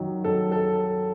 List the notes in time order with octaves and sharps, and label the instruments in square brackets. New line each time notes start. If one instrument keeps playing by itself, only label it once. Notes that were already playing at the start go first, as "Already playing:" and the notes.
Already playing: [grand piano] F#2 D#3 F#3
F#2 A4
A4